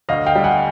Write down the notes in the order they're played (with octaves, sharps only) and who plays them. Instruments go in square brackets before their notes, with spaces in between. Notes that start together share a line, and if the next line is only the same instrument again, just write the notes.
[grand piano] D2 D#5 F5
F5 G5
G3
F#5 G#5